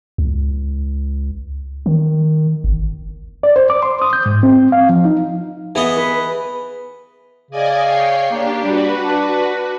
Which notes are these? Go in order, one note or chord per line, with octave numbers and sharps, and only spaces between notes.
C#2
D#3
G1
D5
C5
D6
C6
D#6
G6
G#2
C4
F5
F3
D#4
E3 B3 G#4 D#5
B4
C#3 D5 D#5 G#5
C#5 G5 C7
A#3 D4 G4
G3 F#4 B4
D4